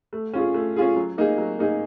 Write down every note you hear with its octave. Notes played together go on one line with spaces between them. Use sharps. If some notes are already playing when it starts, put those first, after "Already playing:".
A3
C#4 F4 G#4
A3
C#4 F4 G#4
F#3
A#3 D#4 G#4
F#3
A#3 D#4 G#4